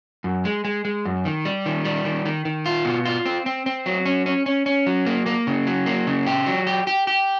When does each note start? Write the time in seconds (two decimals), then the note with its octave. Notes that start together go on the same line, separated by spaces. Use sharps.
0.24 F#2
0.45 G#3
0.65 G#3
0.85 G#3
1.05 F#2
1.25 D#3
1.45 G3
1.66 D#3
1.85 G3
2.05 D#3
2.25 D#3
2.45 D#3
2.66 F4
2.85 B2
3.05 F4
3.26 C4
3.46 C4
3.66 C4
3.86 F#3
4.05 C#4
4.26 C#4
4.46 C#4
4.66 C#4
4.87 F#3
5.06 A#3
5.26 A#3
5.47 C#3
5.67 F#3
5.86 A#3
6.07 C#3
6.26 G4
6.46 F#3
6.67 G4
6.87 G4
7.07 G4